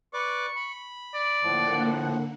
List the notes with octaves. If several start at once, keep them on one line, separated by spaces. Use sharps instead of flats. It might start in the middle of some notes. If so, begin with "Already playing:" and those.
B4 D5 C#6 D6
B5
D5
A2 D3 F3 A#3 F#5